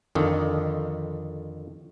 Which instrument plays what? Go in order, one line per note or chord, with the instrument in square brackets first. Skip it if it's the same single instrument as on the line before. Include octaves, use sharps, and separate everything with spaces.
[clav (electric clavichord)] F2 D3 D#3